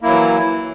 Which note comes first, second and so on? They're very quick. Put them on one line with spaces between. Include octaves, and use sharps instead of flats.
A#3 E4 F#3 E3